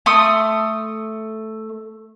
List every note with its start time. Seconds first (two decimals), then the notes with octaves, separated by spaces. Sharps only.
0.06 A3 C6 D#6